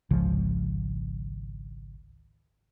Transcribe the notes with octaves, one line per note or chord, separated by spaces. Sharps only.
G#1 C#2 C#3 F3